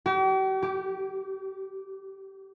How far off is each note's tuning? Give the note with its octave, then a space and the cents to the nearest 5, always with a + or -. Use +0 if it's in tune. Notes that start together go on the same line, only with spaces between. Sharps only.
G4 -45
G4 -15